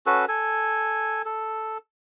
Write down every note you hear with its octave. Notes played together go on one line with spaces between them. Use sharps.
C#4 F#4 A4 B4
A4 G#5
A4